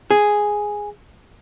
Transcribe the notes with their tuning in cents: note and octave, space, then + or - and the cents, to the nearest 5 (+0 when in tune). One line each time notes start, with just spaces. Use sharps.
G#4 +0